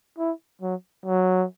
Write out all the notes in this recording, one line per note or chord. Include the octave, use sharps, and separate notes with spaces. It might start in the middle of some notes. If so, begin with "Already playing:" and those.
E4
F#3
F#3